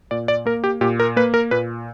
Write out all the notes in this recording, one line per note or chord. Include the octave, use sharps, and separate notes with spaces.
A#2 D5
D5
A#3 A#4
G4
A#2 G4
A#4
A#3 B4
A#4
A#2 B4